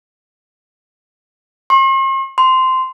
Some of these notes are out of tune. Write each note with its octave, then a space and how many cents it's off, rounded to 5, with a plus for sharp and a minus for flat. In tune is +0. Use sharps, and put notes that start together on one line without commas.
C6 +45
C6 -10